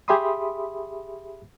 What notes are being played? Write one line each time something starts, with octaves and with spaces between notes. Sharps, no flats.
G4 G#4 E5 B5 C6 D#6